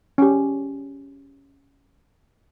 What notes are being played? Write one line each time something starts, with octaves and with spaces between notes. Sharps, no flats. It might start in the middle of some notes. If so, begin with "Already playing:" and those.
C#4 G4